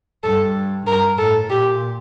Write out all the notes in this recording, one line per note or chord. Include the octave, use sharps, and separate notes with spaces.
G2 A4
G2 A#4
A2 A4
A#2 G4